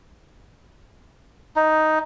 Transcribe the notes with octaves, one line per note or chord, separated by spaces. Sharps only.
D#4